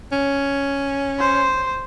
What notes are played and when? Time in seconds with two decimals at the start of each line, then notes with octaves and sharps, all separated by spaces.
0.12 C#4
1.19 C5